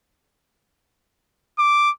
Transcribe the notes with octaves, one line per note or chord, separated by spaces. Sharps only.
D6